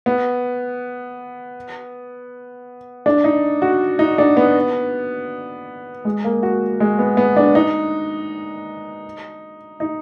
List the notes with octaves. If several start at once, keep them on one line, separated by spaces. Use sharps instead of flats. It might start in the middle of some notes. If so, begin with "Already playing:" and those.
B3
D4
D#4
F#4
D#4
D4
B3
G#3
A#3
F#4
G#3
B3
B3
D4
D#4
D#4